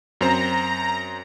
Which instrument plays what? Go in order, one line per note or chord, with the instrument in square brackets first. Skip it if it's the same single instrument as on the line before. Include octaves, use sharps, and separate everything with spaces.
[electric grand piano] F#2 C4 C5 [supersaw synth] A#5